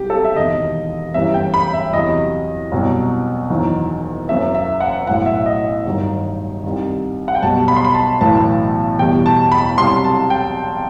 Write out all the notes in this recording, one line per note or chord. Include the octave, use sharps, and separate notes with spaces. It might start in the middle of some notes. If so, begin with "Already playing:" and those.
Already playing: C2 C3 F#3 G4
A4
E5
E1 D#2 D#3 D#5
G1 F#2 E3 G3 E5
G5
B5
E5
E2 C3 F#3 D#5
C2 B2 F#3
F#1 E2 D#3 F#3
F#1 F#2 F#3 E5
E5
F#5
B1 A2 F#3 F#5
E5
D#5
G1 G2 D#3 F#3
C2 C3 D#3
F#5
G5
B1 B2 G3 A5
B5
C6
B5
A5
B1 A2 E3 A5
E2 B2 G3 G5
A5
B5
C2 C3 F#3 C6
A5
G5